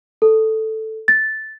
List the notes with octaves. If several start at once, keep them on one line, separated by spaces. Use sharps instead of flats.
A4
A6